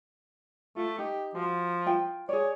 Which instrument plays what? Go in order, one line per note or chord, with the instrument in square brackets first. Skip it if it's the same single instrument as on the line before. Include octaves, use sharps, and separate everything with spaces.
[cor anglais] A3 [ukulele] F4
[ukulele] D#4 [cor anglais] G4
[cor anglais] F3 [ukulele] F#4
[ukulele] F4 G5
[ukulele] G#4 D5 [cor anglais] C#5